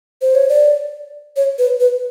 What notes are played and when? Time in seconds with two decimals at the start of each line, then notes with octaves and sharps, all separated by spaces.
0.22 C5
0.35 C#5
0.49 D5
1.36 C#5
1.58 B4
1.80 B4